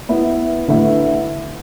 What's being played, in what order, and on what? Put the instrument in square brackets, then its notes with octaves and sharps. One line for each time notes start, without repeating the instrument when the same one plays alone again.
[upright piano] B3 E4 B4 E5
D3 A3 E4 B4 E5